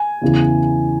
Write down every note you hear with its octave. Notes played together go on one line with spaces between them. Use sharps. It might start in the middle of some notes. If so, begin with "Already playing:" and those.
Already playing: G#5
E2 C#3 E3